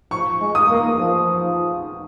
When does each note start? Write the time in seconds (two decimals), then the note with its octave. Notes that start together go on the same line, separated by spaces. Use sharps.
0.11 F3 C#6
0.41 G#3
0.55 D#6
0.70 A#3
0.99 F3